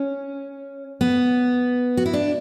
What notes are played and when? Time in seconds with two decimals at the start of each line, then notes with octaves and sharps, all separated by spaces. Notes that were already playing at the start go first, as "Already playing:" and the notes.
Already playing: C#4
1.01 B3
1.97 F#4
2.06 E4
2.13 D4